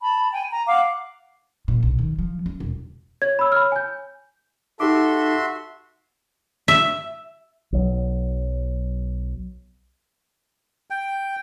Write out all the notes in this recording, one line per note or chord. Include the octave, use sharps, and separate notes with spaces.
A5 B5
G5 G#5
A#5
F5 F#5 D6
A#2
B1
D#3
F3
C#4
E1
C#5 G#6
B5 E6
B5 F6
G#5 G6
D#4 F#4 G4 A4 E5 C6 D6
E5
B1 F#3
G5